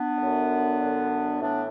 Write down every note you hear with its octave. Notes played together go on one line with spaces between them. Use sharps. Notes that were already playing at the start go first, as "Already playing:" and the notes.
Already playing: B3 D4
F#2 D3
F#2 D3
A2 E3 B3 D4